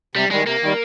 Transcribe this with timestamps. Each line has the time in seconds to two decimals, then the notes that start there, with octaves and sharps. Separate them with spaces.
0.15 C3 G3
0.31 D#3 G3 G#3
0.47 C3 A#3
0.63 D#3 G3